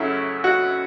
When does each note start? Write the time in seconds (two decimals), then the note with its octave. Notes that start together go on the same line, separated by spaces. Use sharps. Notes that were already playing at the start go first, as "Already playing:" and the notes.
Already playing: F#2 C#3 F#3 A3 C#4 E4
0.44 F#4